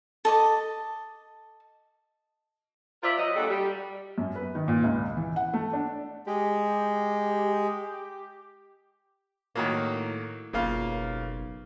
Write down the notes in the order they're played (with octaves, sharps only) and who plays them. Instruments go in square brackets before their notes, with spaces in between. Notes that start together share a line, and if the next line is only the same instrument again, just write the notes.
[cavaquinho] A4 D#5 D6
[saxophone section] F4 A#4 C5 D5 E5
F#3 D#5
A#2 G3 G#3 D4 F#4 A4
G3
[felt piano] F#2
B4
D#3
A#2
C#2
E3
F#5
A3
D4
[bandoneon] G#3 [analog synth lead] G4
[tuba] A2 [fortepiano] D#3 F#3 A#3
[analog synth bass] F#1 [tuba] B1 [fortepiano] C#3 A#3 F4